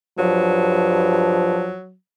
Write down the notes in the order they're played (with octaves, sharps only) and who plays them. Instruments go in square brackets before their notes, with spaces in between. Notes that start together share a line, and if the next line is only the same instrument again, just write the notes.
[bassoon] G2 [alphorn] F3 [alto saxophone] F#3